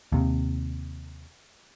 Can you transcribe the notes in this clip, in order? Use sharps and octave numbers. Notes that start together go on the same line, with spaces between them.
D#2 C3